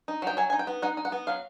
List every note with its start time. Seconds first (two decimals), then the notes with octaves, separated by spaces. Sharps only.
0.08 D#4
0.22 F#3 G5
0.37 F#3 G#5
0.50 D#4 G#5
0.59 G5
0.67 B3
0.82 D#4 F#5
0.97 D#4
1.05 F#5
1.12 B3
1.27 F#3 F5